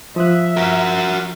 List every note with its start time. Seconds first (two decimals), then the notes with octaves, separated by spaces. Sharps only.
0.16 F3 E5 D#6 F#6
0.57 F#4 A#4